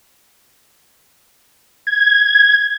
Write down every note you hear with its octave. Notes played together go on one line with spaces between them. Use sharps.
G#6